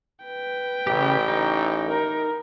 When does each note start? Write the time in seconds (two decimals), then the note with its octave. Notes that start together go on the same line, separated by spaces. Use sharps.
0.25 B4 G5
0.87 A1 C#3 G4
1.28 D#4
1.89 A#4